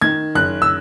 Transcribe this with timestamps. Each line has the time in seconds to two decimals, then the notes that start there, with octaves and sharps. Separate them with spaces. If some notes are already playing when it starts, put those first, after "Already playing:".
0.02 D#3 G#6
0.35 F#1 F#6
0.62 E6